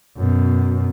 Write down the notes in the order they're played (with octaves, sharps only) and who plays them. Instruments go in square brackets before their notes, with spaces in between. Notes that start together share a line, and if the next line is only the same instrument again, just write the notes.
[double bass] F#2 B2